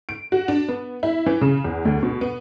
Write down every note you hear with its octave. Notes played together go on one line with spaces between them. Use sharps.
D7
F#4
D4
B3
E4
E3
C#3
E2
D2
B2
B3